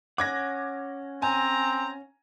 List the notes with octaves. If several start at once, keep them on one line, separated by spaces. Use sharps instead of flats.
C#4 F#5 D6 G#6 A#6
C4 G#5 A#5